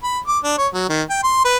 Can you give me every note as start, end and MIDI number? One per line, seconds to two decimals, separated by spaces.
0.03 0.19 83
0.27 0.38 86
0.44 0.53 62
0.58 0.67 73
0.74 0.87 54
0.89 1.02 51
1.10 1.22 79
1.24 1.42 84
1.45 1.57 71